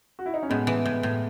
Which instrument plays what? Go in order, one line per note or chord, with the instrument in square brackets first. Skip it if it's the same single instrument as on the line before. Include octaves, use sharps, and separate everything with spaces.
[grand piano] F#4
E4
D#4
C#4
[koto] A2 [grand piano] G#3 B3
[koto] E3
A2
A2